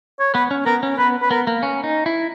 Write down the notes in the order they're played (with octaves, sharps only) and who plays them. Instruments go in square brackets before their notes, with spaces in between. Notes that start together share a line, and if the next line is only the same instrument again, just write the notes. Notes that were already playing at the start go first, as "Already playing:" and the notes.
[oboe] C#5
[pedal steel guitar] B3 [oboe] B4
[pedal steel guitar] C#4
[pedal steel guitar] B3 [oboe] A#4
[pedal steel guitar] C#4
[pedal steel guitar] B3 [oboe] B4
[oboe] B4
[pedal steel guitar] B3 [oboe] A#4
[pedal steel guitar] A#3
C#4
D#4
E4